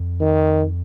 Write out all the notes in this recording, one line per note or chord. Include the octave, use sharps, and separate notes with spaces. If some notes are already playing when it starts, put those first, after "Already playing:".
Already playing: F2
D#3